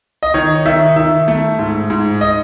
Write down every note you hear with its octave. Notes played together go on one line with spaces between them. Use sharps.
D#5
D#3 C#5
D#3 E5
D#3 E5
A3
G#2
G#2
D#5